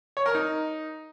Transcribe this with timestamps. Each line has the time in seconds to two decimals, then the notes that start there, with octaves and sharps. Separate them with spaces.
0.17 C#5
0.26 A#4
0.35 D#4